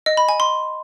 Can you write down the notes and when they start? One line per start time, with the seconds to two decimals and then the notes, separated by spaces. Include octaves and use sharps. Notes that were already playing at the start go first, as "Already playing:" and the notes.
0.06 D#5
0.17 B5
0.29 G#5
0.40 C6